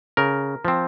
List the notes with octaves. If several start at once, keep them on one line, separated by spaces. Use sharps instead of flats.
C#3 A#4
F3 C4